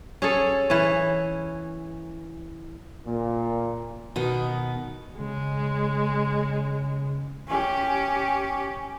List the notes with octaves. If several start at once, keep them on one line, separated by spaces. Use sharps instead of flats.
C#4 G#4 A4
E3 C#4
A#2
B2 D#3 B3
C#3 G#3
C#4 G4